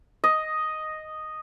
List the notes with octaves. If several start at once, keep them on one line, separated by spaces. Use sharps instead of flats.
D#5